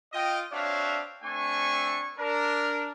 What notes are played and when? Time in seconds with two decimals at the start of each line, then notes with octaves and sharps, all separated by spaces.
0.13 F4 D#5 G5
0.53 C4 D4 F#4 C#5 E5 F5
1.24 A3 C4 D4 G#5 C#6
2.19 D4 A#4